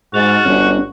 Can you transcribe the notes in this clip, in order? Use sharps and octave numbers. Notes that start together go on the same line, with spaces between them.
G#2 F#4 F6 A6
G1 C#4